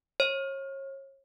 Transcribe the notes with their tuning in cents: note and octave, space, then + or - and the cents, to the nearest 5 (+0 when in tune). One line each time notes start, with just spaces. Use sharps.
C#5 -35